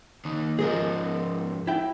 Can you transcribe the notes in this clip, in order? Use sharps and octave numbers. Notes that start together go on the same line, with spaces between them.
D#2 D#3
G#2 F3 G#4 A#4 D#5
E4 G5